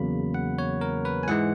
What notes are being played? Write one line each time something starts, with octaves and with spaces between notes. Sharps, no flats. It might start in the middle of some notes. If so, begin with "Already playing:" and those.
Already playing: E2 C#3 F#3 A#3 B5
F#5
C#5
A#4
B4
G#5
G#2 E3 G#3 F#5